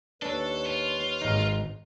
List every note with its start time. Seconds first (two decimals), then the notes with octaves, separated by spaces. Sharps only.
0.22 D#2 D4 A4 B4 C#5
0.66 F4
1.22 G#1 D#4